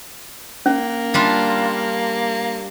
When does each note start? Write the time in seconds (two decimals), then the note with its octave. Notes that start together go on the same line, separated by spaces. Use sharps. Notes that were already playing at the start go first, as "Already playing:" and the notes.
0.66 A#3 C#4
1.14 G3 D4 F4